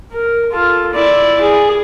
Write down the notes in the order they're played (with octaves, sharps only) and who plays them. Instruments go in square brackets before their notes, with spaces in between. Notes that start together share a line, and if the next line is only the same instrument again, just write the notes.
[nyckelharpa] A#4
F4 A4
E4 D5
G#4